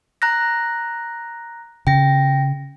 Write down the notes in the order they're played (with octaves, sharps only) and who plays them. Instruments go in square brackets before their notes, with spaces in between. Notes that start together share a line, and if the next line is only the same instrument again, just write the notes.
[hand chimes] A#5 F#6 A#6
[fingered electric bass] C#3 [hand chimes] G5 A#6